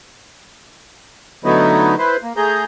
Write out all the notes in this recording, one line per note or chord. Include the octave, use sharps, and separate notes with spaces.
D3 F#3 A3 B3 D#4 E4
E4 B4 C5
A#3
A3 G#4 A#5 G6